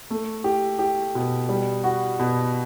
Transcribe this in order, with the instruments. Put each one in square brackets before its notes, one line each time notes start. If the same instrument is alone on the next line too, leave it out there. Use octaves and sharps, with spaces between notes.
[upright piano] A3
G4
G4
B2
G3
F#4
B2